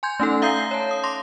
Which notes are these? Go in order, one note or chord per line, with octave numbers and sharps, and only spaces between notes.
G#5 C6 G6 G#6
A3 C#4 D#4 A4
E5 F5 A#5 D#6 G6 C7
C#5 A5
D#6
C6 D6 A#6